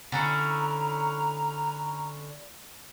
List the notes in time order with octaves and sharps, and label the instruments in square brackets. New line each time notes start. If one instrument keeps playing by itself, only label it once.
[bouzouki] D3 C#4 E4 [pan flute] A#5